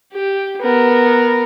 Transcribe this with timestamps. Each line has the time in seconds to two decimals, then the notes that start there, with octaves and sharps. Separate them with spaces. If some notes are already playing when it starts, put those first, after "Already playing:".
0.13 G4
0.61 B3 A#4